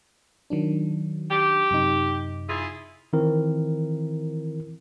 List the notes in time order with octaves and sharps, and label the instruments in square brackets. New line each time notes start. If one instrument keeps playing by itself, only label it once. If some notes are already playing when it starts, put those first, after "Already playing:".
[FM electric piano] D#3 F#3 D4
[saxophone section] G4
[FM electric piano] F#2 C3 D#4
[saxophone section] E4 F4 G#4
[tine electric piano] D#3 E3 C4 E4 A#4